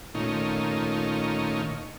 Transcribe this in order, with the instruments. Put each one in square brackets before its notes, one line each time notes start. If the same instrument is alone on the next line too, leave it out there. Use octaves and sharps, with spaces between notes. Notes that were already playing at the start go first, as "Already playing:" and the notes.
[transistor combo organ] A#2 D#3 A3 C#4 D#4 F4